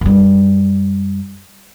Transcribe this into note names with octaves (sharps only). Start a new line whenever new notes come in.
F#2 G3